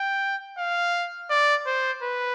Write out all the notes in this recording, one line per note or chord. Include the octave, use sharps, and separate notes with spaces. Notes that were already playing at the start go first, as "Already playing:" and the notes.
Already playing: G5
F5
D5
C5
B4